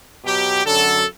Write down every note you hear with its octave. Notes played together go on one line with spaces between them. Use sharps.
B2 F#3 G4
F#2 D3 F#3 A4